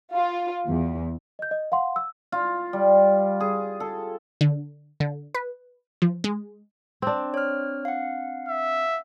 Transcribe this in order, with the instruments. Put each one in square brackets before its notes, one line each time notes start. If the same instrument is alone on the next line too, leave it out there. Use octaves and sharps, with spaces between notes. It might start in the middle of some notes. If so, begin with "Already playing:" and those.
[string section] F4
E2
[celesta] D#5 G6
D#5
F5 F#5 C6
E6
[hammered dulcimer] F4
G3
G#4
A4
[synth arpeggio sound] D3
D3
B4
F3
G#3
[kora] C4 D4
[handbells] C#5 F6
F5 F#5
[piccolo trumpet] E5